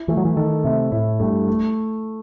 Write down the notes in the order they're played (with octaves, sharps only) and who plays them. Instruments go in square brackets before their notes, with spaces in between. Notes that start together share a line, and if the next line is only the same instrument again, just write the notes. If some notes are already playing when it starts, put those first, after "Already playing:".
Already playing: [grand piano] E4
[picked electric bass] E3 [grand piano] A3
[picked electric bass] F#3
E3
[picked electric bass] D#3 [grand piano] A4
[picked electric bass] C3 [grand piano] A3
[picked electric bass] A2 [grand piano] E4
[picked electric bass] G2 [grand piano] A3
[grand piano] A3